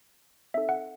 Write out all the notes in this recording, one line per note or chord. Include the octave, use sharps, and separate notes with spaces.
C4 D#4 A4 E5
F#5